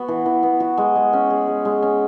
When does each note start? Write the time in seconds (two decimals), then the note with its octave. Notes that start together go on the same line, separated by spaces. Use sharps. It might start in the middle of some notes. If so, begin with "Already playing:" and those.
Already playing: B3 F#4
0.08 E3
0.26 E3
0.43 B3
0.60 F#4
0.77 G#3
0.96 G#3
1.13 C#4
1.30 G#4
1.47 G#3
1.65 G#3
1.82 C#4